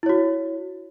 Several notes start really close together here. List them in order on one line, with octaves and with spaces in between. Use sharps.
E4 C#5 F#4